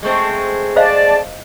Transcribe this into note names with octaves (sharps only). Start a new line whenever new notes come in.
G#3 A3 C4
C5 D5 D#5 F5 A5